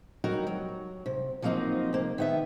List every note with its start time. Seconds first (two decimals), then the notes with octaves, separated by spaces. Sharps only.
0.24 F#3 G3 D#4 F#4 A#4
0.47 F#3
1.06 C3
1.42 F3 F#3 A#3 C4 D#4
1.93 C3 A#3
2.18 D#3 B3 E5